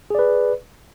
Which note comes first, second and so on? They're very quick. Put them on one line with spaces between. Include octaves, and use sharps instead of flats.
G#4 D5 B4